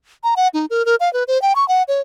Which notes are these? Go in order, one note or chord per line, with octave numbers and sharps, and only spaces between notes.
A#5
F#5
D#4
A#4
A#4
F5
B4
C5
G5
C#6
F#5
C#5